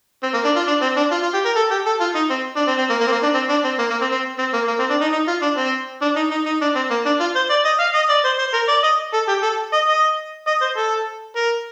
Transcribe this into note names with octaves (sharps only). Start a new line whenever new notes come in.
C4
A#3
D4
F4
D4
C4
D4
F4
F4
G4
A#4
A4
G4
A4
F4
D#4
C4
D4
C4
C4
A#3
A#3
C4
A#3
D4
C4
D4
C4
A#3
A#3
C4
C4
C4
A#3
A#3
C4
D4
D#4
D#4
F4
D4
C4
D4
D#4
D#4
D#4
D4
C4
A#3
D4
F4
C5
D5
D#5
F5
D#5
D5
C5
C5
A#4
D5
D#5
A4
G4
A4
D#5
D#5
D#5
C5
A4
A#4